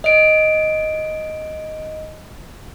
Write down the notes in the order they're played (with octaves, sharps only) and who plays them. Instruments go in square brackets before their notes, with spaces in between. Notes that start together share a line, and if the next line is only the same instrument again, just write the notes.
[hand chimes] D#5 D7